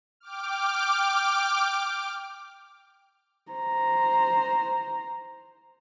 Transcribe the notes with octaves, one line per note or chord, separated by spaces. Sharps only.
G5 D6 F6
C5 A#5